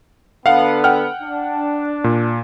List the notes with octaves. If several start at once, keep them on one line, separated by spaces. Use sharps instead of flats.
D3 B3 F5 F#5
F#5 G5 F6
D4
A#2